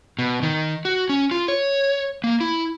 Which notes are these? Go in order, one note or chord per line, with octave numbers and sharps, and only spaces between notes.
B2
D#3
F#4
C#4
F4
C#5
A#3
E4